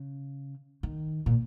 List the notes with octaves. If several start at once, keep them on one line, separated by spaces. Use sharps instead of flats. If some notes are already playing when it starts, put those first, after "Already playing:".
Already playing: C#3
D#3
A#2